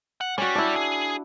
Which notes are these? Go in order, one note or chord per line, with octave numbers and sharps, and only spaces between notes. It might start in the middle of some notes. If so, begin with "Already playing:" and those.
F#5
G3 C#4 F#4
D4 E4
G#4